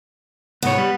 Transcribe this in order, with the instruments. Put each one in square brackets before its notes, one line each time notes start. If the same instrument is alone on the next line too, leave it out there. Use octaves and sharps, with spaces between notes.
[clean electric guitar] C2 G#2 C#5 [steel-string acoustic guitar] B3
[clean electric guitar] G3